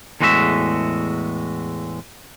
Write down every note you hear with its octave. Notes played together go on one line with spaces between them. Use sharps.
E2 A2 G#3 F#4 A4 E5